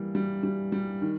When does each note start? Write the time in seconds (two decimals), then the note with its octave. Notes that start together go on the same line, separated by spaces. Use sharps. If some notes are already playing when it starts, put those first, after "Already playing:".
Already playing: E3 G3 A#3
0.15 G3
0.43 G3
0.72 G3
1.02 D#3